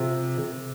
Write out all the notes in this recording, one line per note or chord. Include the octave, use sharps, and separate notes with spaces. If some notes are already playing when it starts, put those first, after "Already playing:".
Already playing: C3 F3
C3